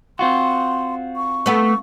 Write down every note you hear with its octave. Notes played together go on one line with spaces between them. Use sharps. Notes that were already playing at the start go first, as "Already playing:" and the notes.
C4 F4 F#4 C6
C#6
A3 B3